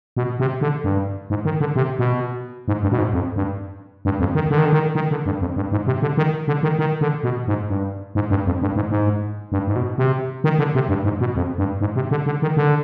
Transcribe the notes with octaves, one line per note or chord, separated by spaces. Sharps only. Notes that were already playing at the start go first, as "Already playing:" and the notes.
B2
C3
D3
G2
G#2
D#3
D3
C3
B2
G#2
G2
B2
G#2
F2
G2
G2
F2
D#3
D3
D#3
D3
D#3
D#3
D3
G2
F2
G2
G#2
C3
D3
D#3
D3
D#3
D#3
D3
B2
G#2
G2
G#2
G2
F2
G2
G#2
G#2
G2
G#2
B2
C3
D#3
D3
C3
G2
G#2
B2
F2
G2
G#2
C3
D3
D3
D#3
D3